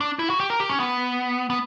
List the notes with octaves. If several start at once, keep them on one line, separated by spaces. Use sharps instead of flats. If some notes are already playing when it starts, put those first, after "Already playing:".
D4
E4
F#4
G4
A#4
G4
C#4
B3
B3